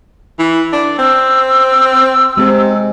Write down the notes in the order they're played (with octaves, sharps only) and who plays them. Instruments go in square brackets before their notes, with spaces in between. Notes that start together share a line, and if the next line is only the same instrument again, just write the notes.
[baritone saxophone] E3
D4
[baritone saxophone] C4 [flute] E6
[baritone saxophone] C3 [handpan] G#3 C4